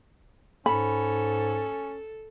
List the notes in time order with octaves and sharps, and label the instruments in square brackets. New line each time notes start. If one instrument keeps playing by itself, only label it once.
[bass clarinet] G#2 [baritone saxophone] C#4 [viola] A4 [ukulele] B5